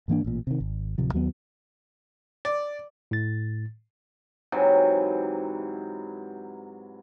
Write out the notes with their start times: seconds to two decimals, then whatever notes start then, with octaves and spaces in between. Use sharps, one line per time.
0.08 G#2 E3 A#3 D4
0.24 A1 A#2
0.47 C3 D#3
0.60 G#1
0.98 D1 C3 F3
1.13 D#2 F#3 G3 B3
2.45 D5
3.11 A2 A6
4.52 G#2 C3 E3 F#3